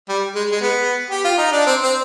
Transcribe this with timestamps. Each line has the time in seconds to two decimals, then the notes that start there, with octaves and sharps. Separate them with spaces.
0.09 G3
0.35 G#3
0.51 G#3
0.62 B3
1.10 G4
1.25 F4
1.38 D#4
1.52 D4
1.67 C4
1.83 C4